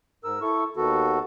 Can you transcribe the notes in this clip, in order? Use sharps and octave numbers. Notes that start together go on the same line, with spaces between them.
G#2 A#4 E6
E4 A4 C#6
D#2 D#3 B3 F#4 A4